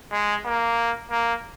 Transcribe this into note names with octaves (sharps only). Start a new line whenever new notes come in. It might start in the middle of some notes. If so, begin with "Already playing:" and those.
G#3
A#3
A#3